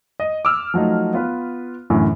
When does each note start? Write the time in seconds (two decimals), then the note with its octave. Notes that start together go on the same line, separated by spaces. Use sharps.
0.20 D#5
0.45 D6 E6 F6
0.74 F3 F#3 A3 D#4
1.13 B3 F4 B4
1.90 F#2 A2 D3 E3